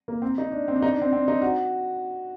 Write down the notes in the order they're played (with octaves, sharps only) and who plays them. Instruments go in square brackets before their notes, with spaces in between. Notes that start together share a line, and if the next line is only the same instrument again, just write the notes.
[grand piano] A#3
C4
D#4
D4
C4
D4
D#4
D4
C4
C4
D#4
F#4